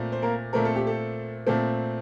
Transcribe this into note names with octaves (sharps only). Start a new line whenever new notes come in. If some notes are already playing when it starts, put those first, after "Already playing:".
Already playing: A#2 A3 C4
C5
A#3 A#4
A#2 A3 C4 A#4
A4
G4
A4
A#2 A3 C4